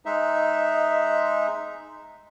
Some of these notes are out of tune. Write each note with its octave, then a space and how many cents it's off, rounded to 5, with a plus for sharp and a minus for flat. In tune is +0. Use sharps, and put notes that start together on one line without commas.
G#3 +10 D#4 +0 E5 +0